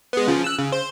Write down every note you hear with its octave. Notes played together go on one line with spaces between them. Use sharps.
G#3 B3
C#3 F3
E6 F#6
C#3
C5